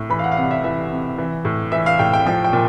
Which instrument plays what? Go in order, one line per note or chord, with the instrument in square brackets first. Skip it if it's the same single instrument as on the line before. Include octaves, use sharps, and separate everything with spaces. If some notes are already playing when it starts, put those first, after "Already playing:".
Already playing: [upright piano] A2
E3 B5
F5
F#5
F5
C3 F#5
E5
E3 E5
C3
E3
A2
E3 E5
F5
A2 G5
G5
F3 G5
G5
A#2